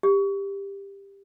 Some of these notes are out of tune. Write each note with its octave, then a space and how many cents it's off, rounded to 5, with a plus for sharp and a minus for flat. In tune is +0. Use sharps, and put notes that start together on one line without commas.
G4 +15